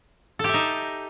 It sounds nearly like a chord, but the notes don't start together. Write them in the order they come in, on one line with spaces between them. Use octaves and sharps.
A4 G4 E5 D#4